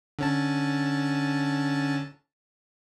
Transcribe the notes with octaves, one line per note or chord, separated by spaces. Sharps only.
D3 C#4 A5